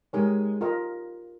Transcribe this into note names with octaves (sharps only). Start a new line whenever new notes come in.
G#3 D#4 G4 A#4 C#5 G#5
F4 A#4 D#5 A#5